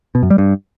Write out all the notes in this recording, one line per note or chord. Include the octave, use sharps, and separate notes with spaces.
B2
F#2
G3
G2